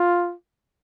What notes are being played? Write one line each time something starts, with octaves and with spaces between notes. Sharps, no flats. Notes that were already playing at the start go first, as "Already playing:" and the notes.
Already playing: F4